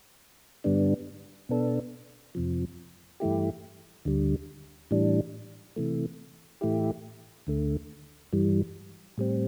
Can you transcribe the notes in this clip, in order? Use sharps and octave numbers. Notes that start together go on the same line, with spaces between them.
G2 D3 G3 B3 D4
B2 B3 D4 A4
F2 C3 F3
G2 E3 A3 E4 G4
D2 D3 G3
A2 E3 G3 D4
C3 E3 A3
A2 E3 A3 E4 G4
D2 D3 A3
G2 E3 G3
A2 G3 C4